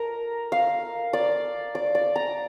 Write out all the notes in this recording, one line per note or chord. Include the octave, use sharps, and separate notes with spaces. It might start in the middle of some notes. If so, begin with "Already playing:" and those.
Already playing: A#4
F5
D5
D5
D5
A#5